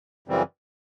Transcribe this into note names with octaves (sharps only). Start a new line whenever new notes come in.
F#2 C#3 E3 G3 C4